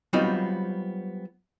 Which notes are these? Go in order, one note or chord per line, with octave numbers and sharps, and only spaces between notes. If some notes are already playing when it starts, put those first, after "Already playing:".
F#3 G3 B3 C4 D#4 F4